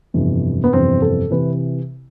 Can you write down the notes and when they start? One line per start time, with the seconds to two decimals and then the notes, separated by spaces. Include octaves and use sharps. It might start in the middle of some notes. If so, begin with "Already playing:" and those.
0.14 G1 F2 C3 E3
0.64 B3
0.72 G1 F2 C3 E3 C4
1.02 A4
1.31 C3 E3 B4